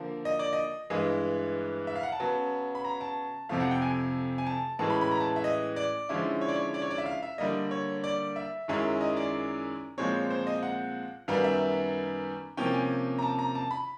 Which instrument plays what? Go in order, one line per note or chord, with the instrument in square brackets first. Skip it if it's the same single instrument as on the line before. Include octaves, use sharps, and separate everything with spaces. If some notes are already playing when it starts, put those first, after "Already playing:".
Already playing: [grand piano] D3 F3 A#3
D#5
D5
D#5
G2 E3 G#3 D#5
E5
F5
F#5
A5
C#3 F#3 B3
B5
A#5
A5
F2 C3 F3 A3 F5
F#5
G5
G#5
G#5
A5
A2 E3 G#3 C#4 A5
B5
B5
A#5
A5
E5
D#5
D5
D3 F3 G#3 C#4 E4
C#5
D5
C#5
D5
C#5
D5
E5
F5
E5
D3 G3 A#3 D#5
C#5
D5
E5
F#2 D#3 G#3 C#4 E4
D#5
D5
A#2 F3 G#3 C4 C#5
C5
D#5
F#5
F#2 D#3 G3 B3 F5
E5
C3 F3 A#3 C#4 G5
G#5
A#5
A5
A#5
A5
B5